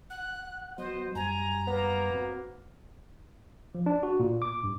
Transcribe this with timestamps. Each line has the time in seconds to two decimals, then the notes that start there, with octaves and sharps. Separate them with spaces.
0.10 F#5 F#6
0.78 F#3 B3 F#4 C5 D#5
1.15 F#2 G3 G#5 A#5
1.67 A#3 B3
2.12 C4 F#4
3.75 F3
3.86 D4
4.03 F#4
4.20 A#2
4.42 D6
4.64 G2